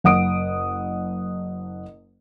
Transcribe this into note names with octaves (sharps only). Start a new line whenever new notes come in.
F#1 F#5 D#6 D7